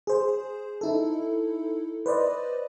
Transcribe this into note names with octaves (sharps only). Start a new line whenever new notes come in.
G#4 C5
D#4 E4 A4
B4 C5 D5 D#5